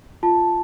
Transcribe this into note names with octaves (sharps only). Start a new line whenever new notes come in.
F4 A5